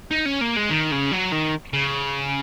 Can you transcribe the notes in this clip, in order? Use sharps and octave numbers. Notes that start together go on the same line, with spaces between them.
D#4
C#4
A#3
G#3
D#3
C#3
F#3
D#3
C#3